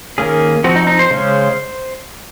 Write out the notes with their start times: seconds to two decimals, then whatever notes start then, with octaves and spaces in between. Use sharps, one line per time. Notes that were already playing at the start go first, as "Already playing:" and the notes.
0.18 D#3 A#3 C#4 G#4
0.64 F3 C4 F#4
0.76 D#4
0.87 D#4
0.99 C5
1.11 C#3 G#3 C#4